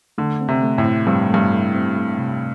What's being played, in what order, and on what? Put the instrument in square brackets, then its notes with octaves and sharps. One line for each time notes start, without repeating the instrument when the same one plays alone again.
[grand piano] D3 [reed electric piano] A3
[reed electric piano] C4
[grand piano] C3
[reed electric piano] A3
[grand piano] A2
[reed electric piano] C4
[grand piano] G2 [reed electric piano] C4
[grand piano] G2 [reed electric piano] A3
[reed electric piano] A3
C4
A3
C3